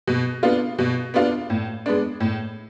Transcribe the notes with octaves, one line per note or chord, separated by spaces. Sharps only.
B2
B3 D4 F4
B2
B3 D4 F4
A2
G#3 B3 D4
A2